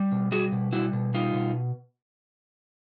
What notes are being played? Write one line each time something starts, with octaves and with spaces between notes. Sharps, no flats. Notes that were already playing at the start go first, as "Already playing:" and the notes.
Already playing: G3
B2
G3 F#4 G#4
B2
G3 E4 F#4
B2
G3 D#4 F4
B2